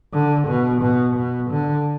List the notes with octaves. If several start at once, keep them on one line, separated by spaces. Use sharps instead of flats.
D3
B2
B2
B2
D3